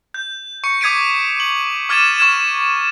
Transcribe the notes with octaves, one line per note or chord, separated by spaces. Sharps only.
G6
C#6 C#7
D6 D#6 G#6 B6 D7 D#7
F#7
D6 F6 G#6 A6 D#7 E7
C#6 F6 G#6 E7